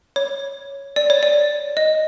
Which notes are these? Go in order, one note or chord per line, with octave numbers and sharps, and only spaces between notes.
C#5
D5
C#5
D5
D#5